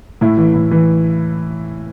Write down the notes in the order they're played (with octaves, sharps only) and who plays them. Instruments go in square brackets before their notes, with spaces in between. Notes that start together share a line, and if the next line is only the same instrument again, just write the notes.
[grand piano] A2 E4
E3
A2
E3